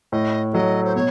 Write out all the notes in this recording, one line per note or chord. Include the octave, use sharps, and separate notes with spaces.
A2 D#5
F#3 A3 D#5
C5
B2 C#5